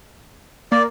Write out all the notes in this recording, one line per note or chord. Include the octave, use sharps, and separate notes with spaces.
A#3 D5